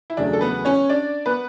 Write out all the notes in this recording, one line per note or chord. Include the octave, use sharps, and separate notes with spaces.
E4
E2 C#3 F#3 A3 D4
A4
B3 B4
C#4 C#5
D4 D5
B3 B4